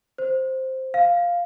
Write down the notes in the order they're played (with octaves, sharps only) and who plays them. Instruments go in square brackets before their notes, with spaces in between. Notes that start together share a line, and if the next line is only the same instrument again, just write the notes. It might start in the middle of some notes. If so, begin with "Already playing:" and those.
[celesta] C5
F5